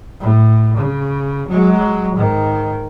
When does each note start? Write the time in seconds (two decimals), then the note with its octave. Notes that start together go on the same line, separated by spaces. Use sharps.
0.20 A2
0.78 C#3
1.48 F#3 G#3
2.16 G#2 D#3